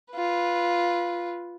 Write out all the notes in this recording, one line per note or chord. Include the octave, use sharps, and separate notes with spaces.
F4 B4